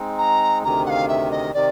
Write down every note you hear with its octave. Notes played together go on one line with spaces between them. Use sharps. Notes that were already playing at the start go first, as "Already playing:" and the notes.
Already playing: G#3 C4 D#4
A#5
D2 C3 D#3 A#5
F#5
F5
E5
D#5
C3 D#3 D5